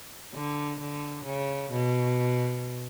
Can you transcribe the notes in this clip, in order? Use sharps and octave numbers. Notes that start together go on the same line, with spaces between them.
D3
D3
C#3
B2